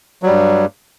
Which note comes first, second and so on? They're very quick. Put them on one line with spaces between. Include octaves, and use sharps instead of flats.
F#3 G3 G2